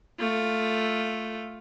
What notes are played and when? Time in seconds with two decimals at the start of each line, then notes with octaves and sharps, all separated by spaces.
0.19 A3 F4